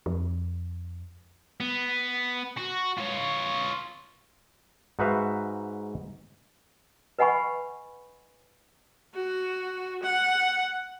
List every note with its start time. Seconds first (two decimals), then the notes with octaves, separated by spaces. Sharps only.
0.06 F2
1.60 B3
2.57 F#4
2.98 F4 C#5
4.99 G#2 D#4 F#4 B4 E5 F5
7.19 B4 D#5 F#5 G#5 B5 C#6
9.14 F#4
10.02 F#5